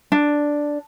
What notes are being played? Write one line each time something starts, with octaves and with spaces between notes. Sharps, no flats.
D4